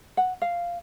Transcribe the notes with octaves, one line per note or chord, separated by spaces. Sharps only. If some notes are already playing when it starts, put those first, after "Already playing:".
F#5
F5